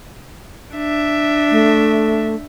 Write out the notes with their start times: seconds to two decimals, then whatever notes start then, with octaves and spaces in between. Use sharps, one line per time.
0.75 D4 E5
1.51 A3